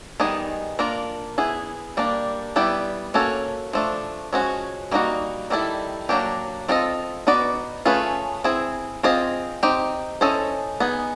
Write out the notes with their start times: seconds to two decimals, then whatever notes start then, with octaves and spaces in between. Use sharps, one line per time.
0.20 D#3 G3 B3 D#4 G#4
0.79 A#3 D4 F4 A#4
1.38 B3 E4 G#4
1.97 G3 A#3 D4
2.56 G3 B3 E4 G4
3.14 A#3 C#4 F#4 A4 C#5
3.73 F3 A3 D4
4.33 F3 G#3 C#4 F#4
4.91 G3 A#3 D#4 F#4
5.50 D#3 G3 C4 E4 A4
6.09 F#3 A#3 D4 G4
6.68 C4 F4 A4 C5 D#5
7.27 B3 D#4 F#4 B4 D5
7.85 A3 C#4 F4 G#4 B4
8.44 C4 E4 G#4
9.03 C4 F4 G#4 C5 D#5
9.63 C4 D#4 G4
10.21 C#4 E4 A4 C5 D#5
10.80 B3 D#4 G#4